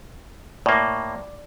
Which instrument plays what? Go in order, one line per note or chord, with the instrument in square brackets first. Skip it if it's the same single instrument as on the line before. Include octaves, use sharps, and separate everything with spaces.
[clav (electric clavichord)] A2 A#3 [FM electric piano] D5